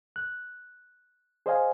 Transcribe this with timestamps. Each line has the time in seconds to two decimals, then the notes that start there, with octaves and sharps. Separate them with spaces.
0.16 F#6
1.46 G#4 C5 D5 D#5 F5 G#5